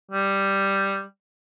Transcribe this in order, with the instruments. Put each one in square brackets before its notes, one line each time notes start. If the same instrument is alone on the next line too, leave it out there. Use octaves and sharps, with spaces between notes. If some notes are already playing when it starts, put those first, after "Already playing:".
[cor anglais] G3